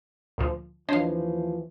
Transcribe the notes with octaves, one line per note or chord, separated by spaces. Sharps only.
D2 A#2 F3
D#2 E3 F3 D4 C5 C#5 D#5 F5